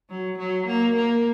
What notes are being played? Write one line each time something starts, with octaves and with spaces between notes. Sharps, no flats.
F#3
F#3
A#3
A#3